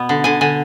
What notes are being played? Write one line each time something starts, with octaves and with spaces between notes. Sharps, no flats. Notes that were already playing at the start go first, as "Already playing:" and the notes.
Already playing: B2 B3
D3
D3 G#5
D3 G#5